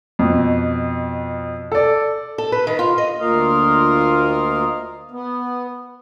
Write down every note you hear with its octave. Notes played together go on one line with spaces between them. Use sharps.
F2 B2
A4 D5
A4
B4
D#3
F4
D#5
D2 A#3 F4 A#4 D#5 F5
B3